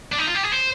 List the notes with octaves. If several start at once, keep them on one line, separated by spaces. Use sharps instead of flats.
D4
D#4
F4
G4
G#4
C5